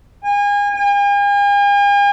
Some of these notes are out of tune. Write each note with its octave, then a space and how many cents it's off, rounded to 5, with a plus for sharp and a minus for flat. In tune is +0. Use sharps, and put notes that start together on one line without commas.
G#5 -30
G#5 -45